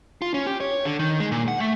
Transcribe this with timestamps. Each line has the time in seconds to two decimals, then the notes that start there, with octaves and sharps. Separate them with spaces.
0.22 F4
0.34 C#4
0.47 G4
0.60 C#5
0.85 D3
0.99 D#3
1.20 G#3
1.31 A#2
1.48 F#5
1.60 A3